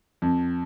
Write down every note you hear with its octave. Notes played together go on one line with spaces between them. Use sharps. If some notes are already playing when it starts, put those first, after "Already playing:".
F2